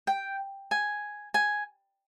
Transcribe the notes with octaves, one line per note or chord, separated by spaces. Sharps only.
G5
G#5
G#5